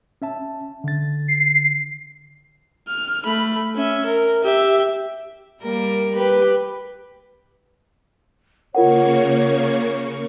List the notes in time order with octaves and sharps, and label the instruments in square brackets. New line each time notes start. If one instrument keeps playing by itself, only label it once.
[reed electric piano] C#4 E5 A5
D3 A6
[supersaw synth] C7
[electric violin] F6
A3 B5
C#4 E5
A#4
G4 E5
[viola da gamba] G3 A#3 A#4
G4 B4
[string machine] C#3 A#3 C#6 [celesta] F4 A#4 F#5 [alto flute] C#5